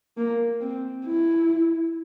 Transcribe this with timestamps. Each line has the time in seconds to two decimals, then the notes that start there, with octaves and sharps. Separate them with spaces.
0.17 A#3
0.61 C4
1.06 E4